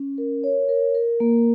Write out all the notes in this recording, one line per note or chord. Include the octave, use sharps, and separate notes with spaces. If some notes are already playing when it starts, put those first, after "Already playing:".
Already playing: C#4
A#4
C#5
A#4
A#4
A#3